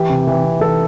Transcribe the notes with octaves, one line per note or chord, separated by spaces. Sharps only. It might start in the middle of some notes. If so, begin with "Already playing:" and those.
Already playing: E3 G4
C3
E3
C3
E3 A4